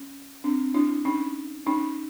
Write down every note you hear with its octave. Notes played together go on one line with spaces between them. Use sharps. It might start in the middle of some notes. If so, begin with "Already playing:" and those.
Already playing: C#4
C4 D4
D4 E4
C#4 D#4
C#4 D#4